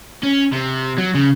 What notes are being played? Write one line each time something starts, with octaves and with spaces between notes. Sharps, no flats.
C#4
C3
F#3
C#3